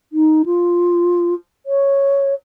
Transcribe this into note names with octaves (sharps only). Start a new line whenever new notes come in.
D#4
F4
C#5